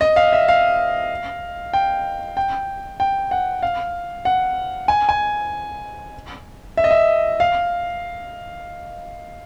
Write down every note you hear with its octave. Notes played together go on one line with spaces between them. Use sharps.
D#5
F5
E5
F5
G5
G5
G5
F#5
F5
F#5
G#5
G#5
E5
D#5
E5
F5